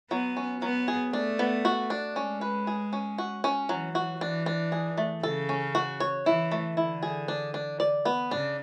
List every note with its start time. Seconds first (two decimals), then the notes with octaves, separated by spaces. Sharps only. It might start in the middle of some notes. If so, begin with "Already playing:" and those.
0.11 F#3 B3
0.37 C#4
0.62 F#3 B3
0.88 G#4
1.13 A3 D4
1.39 B3
1.65 F#4
1.90 D4
2.16 G#3 C#4
2.41 B4
2.67 G#4
2.93 C#4
3.18 F#4
3.44 C#4
3.69 E3 F#3
3.95 F#4
4.21 E3 D4
4.46 D4
4.72 G#4
4.98 A3
5.23 C#3 A4
5.49 C#4
5.75 F#4
6.00 C#5
6.26 E3 E4
6.51 A3
6.77 D3 E4
7.03 G#4
7.28 D4
7.54 D4
7.80 D5
8.05 B3
8.31 C#3 D4